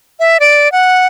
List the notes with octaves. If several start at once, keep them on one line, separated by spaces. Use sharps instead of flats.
E5
D5
F#5